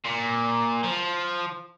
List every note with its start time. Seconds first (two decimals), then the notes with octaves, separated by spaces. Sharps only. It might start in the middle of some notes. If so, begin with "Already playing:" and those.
0.05 A#2
0.84 F3